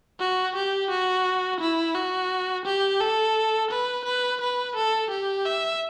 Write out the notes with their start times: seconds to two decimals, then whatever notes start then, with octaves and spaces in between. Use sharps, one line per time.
0.20 F#4
0.56 G4
0.91 F#4
1.60 E4
1.95 F#4
2.66 G4
3.00 A4
3.71 B4
4.05 B4
4.41 B4
4.76 A4
5.11 G4
5.45 E5